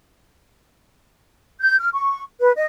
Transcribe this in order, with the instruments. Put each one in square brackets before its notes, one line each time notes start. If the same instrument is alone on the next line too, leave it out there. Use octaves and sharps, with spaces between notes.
[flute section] G6
F6
C#6
B4
D#5